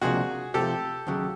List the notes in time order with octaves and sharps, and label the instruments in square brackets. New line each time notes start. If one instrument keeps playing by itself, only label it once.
[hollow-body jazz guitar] C#2 C3 F3 A#3 D4 [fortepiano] F#4 G#4
[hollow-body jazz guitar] C3 F3 A3 [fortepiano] G4 A4
[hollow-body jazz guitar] D#2 C#3 F#3